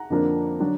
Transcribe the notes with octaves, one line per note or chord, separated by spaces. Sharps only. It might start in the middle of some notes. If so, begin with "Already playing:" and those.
Already playing: F#5 A#5
F2 D3 F3 A#3 D4
D3 F#3 D4